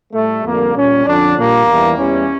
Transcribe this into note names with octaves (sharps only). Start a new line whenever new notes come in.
A2 G3 A3
F2 D3 G3 A#3
A#2 G3 C#4
F2 D3 F3 D4
A#2 G3 A#3
E2 E3 G3
E2 E3 G3 C#4